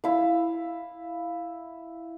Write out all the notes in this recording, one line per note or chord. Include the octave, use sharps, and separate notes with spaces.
E4 F5